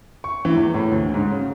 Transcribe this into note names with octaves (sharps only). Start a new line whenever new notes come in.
C#6
E3
E2
A2
D2
G#2
C#3